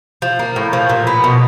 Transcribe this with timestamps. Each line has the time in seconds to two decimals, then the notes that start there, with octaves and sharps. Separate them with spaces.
0.22 F3
0.39 A#3
0.56 A2
0.73 F3
0.89 A#2
1.07 B3
1.24 B2